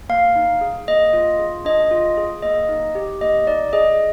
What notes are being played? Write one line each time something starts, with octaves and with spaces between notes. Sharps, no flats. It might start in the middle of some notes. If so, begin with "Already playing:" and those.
A#3 F5
D#4
G#4
A#3 D#5
F4
G#4
D4 D#5
F4
G#4
A#3 D#5
D#4
G4
A#3 D#5
D#4 D5
G#4 D#5